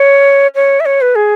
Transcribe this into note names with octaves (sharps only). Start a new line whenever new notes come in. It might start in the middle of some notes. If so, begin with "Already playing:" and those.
Already playing: C#5
C#5
E5
C#5
B4
G#4